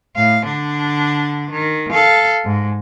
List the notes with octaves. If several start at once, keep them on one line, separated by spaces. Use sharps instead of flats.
A2 F5
D3 D4
D#3
A4 F5
G#2